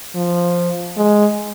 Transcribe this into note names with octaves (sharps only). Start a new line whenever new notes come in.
F3
G#3